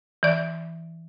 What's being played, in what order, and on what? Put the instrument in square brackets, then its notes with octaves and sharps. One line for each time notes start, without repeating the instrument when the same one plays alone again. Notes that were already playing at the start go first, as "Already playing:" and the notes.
[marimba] E3 D5